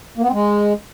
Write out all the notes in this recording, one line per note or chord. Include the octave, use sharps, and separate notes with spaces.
A#3
B3
C4
G#3